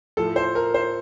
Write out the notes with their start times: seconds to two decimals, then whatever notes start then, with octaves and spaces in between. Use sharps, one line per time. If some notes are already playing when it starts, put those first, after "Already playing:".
0.17 A2 F3 A4
0.36 C5
0.55 A#4
0.74 C5